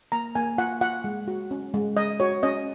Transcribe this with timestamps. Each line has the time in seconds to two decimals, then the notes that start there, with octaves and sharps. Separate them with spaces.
0.12 A#3 A#5
0.35 A#3 G#5
0.58 F4 F#5
0.81 F4 F#5
1.04 G#3
1.28 F#4
1.51 C#4
1.74 G#3
1.97 G#3 D#5
2.20 F#4 C#5
2.43 C#4 D#5